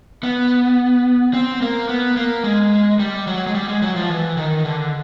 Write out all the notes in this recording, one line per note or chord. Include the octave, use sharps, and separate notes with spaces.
B3
C4
A#3
B3
A#3
G#3
G3
F#3
G#3
G3
G#3
F#3
F3
E3
D#3
D3